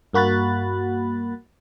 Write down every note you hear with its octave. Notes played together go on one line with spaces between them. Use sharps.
G2 A#3 F#4 B5 F#6 A6